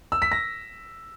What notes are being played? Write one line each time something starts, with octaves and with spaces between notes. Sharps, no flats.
E6
B6
A#6